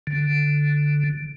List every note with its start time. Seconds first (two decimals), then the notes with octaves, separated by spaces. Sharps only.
0.07 D3